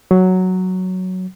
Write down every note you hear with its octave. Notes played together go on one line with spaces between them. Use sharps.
F#3